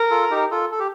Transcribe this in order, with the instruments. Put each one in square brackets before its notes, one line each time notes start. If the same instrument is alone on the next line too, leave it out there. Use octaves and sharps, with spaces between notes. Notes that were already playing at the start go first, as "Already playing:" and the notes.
Already playing: [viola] A#4
[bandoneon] F4 A4
D#4 G4
F4 A4
A4
G4